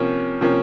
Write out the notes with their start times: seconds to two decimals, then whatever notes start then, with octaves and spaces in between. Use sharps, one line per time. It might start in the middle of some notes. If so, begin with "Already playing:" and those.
Already playing: C3 F3 A#3 C#4
0.41 C3 F3 A#3 C#4